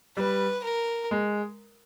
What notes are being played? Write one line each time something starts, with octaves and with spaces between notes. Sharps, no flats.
G3 B4
A#4
G#3